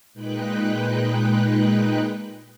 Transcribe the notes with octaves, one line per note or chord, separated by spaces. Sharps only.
A#2 G#3 D#4 B4 G5 F#6